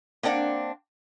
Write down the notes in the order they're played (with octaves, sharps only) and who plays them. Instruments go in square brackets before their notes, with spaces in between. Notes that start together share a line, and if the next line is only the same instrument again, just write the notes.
[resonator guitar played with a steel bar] A#3 C4 D4 D5 F#5